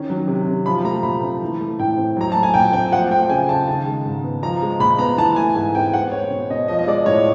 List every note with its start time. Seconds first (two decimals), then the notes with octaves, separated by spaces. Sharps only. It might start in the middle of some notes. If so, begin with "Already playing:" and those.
Already playing: D#3 C#4
0.10 F#3
0.28 C3
0.47 C3
0.66 F3 B5
0.85 A3 A#5
1.03 A#2 B5
1.23 C4
1.42 E3
1.61 A3
1.79 A2 G5
1.98 C4
2.16 F#3 A#5
2.32 A3 A5
2.43 G#5
2.54 A#2 G5
2.73 C4 G5
2.91 F3 F#5
3.10 A3 G5
3.29 C#3 G#5
3.49 C#3 A5
3.68 D#3 A5
3.86 G#3
4.05 G#2
4.24 B3
4.43 F3 A#5
4.62 G#3
4.80 A#2 B5
4.99 B3 A#5
5.17 E3 A5
5.36 A3 G#5
5.55 G#2 G#5
5.75 C4 G5
5.93 G#3 F#5
6.12 B3 C#5
6.30 B2
6.50 B2 D#5
6.68 F3 D#5
6.79 D#5
6.87 G#3 D5
7.06 A2 C#5